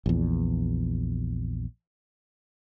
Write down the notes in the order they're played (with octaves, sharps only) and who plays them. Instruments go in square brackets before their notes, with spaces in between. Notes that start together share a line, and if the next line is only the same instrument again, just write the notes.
[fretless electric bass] A#1 E2